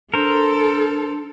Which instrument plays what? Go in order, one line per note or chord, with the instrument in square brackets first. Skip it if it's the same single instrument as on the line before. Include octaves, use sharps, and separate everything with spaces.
[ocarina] D4 [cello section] A4 [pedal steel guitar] A#4 C5